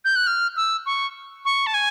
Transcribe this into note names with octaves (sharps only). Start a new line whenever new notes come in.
G6
F#6
F6
E6
C#6
C#6
A5
G#5